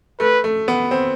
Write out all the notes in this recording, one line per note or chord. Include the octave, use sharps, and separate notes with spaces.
A3 B4
A3
B3
C4